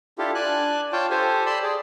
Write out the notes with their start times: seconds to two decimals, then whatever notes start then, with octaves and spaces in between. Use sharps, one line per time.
0.18 D4 E4 F4 G4 A4
0.35 D4 D5 G#5 F#6
0.92 F4 C#5 G5 A5
1.10 G4 A4 C5 G#5
1.46 D5 A5 B5 C6 E6
1.63 G#4 D5